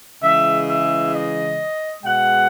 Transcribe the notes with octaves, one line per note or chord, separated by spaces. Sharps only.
C#3 E3 G#3 E5
E5
D#5
B2 G#3 F#5